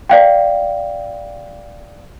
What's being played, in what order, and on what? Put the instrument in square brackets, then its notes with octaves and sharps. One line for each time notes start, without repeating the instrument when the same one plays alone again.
[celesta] D5 F5 G5